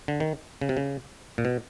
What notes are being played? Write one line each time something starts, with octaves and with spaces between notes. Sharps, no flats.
D3
D#3
C#3
C3
C#3
A#2
B2